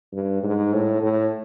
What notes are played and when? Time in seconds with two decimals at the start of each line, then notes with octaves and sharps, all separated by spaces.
0.12 G2
0.43 G#2
0.73 A2
1.02 A2